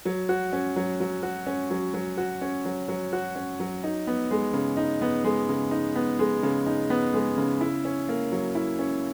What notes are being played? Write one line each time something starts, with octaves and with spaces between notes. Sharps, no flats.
F#3
F#4
C#4
F#3
F#3
F#4
C#4
F#3
F#3
F#4
C#4
F#3
F#3
F#4
C#4
F#3
D#4
B3
G#3
C#3
D#4
B3
G#3
C#3
D#4
B3
G#3
C#3
D#4
B3
G#3
C#3
E4
C#4
A#3
F#3
E4
C#4